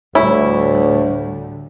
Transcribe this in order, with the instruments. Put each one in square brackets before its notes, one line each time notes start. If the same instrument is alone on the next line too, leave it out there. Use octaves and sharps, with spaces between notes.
[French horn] D2 [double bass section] A2 D3 G3 [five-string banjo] E4 [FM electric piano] C#5